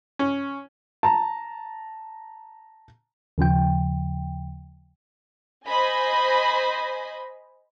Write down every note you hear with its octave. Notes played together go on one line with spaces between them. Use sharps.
C#4
A5 A#5
D#2 C#3 F3 G5
C5 D#5 G#5 B5